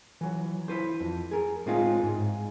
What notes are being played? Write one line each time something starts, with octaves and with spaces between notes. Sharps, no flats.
E3 F#3
E4 B4 C5
F2
G#4 A#4
A2 G#3 C4 D#4 F4 G#4
G#2